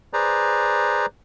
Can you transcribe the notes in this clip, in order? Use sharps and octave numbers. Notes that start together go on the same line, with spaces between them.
G#4 B4 C5 D5 A#5